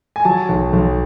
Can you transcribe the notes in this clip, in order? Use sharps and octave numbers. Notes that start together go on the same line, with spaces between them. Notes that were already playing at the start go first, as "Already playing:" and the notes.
G#5
F#3 A5
B1
B1